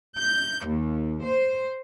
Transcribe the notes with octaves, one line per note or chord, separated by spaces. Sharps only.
G6
D#2
C5